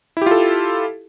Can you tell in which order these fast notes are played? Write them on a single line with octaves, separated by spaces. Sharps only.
E4 G4 F4 A4